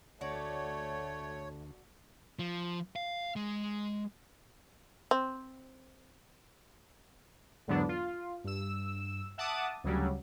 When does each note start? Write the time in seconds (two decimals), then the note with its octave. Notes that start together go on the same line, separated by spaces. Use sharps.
0.21 D2 A3 F#4 C#5 D5
2.39 F3
2.96 F5
3.36 G#3
5.11 C4
7.67 E2 G#2 D3 F#3 B3 D4
7.89 F4
8.44 G2 E6
9.38 E5 F#5 A5 D6 D#6
9.84 D2 C#3 F#3 G3